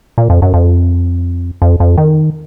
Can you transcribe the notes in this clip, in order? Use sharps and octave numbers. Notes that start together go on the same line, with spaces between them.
A#2
F2
F#2
F2
F2
F2
D#3